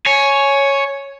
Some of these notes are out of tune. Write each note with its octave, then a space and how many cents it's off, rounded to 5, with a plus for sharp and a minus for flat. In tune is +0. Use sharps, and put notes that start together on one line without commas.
C#5 +0 G#5 +15